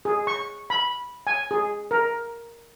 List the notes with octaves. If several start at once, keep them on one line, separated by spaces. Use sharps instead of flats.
G#4
C#6
B5
G#5
G#4
A#4